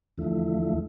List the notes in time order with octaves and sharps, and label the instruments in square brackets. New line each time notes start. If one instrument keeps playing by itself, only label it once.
[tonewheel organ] E2 D3 F3 A3 E4